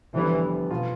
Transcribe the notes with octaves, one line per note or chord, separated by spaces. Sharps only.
F1 F2 D3 E3 G3 B3
B2 B3 F4